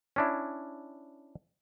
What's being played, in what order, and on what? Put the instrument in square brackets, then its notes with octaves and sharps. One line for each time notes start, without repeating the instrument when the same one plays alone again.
[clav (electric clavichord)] C#4 D4 E4